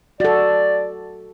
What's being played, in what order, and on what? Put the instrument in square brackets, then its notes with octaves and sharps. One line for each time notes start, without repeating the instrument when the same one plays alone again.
[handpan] F#4 A4 [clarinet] D5